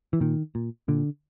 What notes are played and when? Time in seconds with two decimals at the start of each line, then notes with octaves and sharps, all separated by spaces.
0.13 E3
0.20 A#2 D#3
0.55 A#2
0.88 A#2 D3